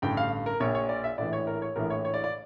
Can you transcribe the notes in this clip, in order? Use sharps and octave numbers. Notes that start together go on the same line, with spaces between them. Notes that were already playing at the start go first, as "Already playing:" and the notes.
A1 G2 D3 G5
F5
A#4
A#1 A#2 C#5
C#5
D5
E5
A#1 A2 E3 D5
C#5
A#4
C#5
A#1 A2 E3 A#4
C#5
C#5
D5
D5